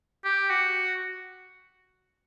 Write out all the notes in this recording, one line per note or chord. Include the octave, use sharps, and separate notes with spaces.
G4
F#4